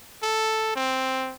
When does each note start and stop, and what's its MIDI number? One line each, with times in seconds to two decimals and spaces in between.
0.23 0.73 69
0.76 1.34 60